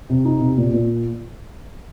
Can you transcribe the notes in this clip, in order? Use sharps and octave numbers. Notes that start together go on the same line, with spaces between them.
C3
D#4
C3
A#2
A#2